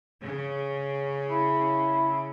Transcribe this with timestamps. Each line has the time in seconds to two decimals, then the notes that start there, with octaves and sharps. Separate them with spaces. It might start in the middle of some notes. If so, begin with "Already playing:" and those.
0.23 C#3
1.30 E4